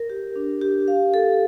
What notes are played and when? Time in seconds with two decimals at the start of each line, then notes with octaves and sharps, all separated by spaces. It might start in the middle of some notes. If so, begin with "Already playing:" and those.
Already playing: A#4
0.10 G4
0.36 D4
0.61 G4
0.88 F5
1.14 A4